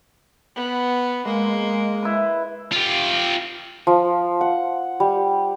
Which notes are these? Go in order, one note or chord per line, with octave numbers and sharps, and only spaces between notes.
B3
G#3 A#3
E4 B4
F4 G4
F3
F#5
G3